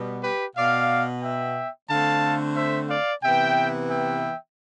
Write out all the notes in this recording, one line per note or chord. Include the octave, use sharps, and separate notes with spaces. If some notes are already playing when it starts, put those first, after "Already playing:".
Already playing: B2 G3 B3
G4 B4
B2 B3 D5 F5
E5 G5
D3 A3 C4 F5 A5
C5 E5
D5 F5
C3 E3 B3 E5 G5
E5 G5